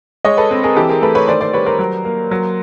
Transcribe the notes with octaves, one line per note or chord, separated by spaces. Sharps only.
G#3 C#5 D#5
A4 B4
C4
G#4 A#4
E3 G4 A4
G#4 A#4
A3 A4 B4
B4 C#5
D#3 C5 D5
C5 D5
G3 B4 C#5
A#4 C5
F#3
A#3
F#3